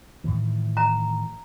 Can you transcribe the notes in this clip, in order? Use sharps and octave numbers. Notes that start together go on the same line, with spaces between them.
A2 D#3 E3
A#5